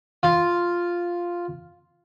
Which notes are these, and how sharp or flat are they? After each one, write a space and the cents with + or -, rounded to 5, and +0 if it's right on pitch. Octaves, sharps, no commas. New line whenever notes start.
F4 +0